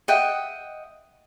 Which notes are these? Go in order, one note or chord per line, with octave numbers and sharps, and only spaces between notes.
D#5 E5 F#5 G5